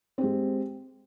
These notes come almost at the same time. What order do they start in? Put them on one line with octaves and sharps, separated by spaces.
C4 G4 G#3